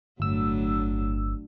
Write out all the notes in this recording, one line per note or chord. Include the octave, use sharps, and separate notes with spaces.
G1 A2 F#3 D4 E6